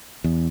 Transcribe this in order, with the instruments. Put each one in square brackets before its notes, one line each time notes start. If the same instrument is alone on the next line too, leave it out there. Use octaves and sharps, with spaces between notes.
[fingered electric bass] E2